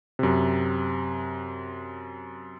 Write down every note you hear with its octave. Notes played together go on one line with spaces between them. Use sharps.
F#2 C3